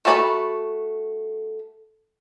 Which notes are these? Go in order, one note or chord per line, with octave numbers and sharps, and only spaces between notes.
A3 F#4 A4 D5 B5